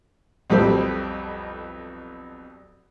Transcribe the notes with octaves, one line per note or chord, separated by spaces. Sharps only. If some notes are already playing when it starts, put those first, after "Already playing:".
B1 F2 G3 G4 A4 C5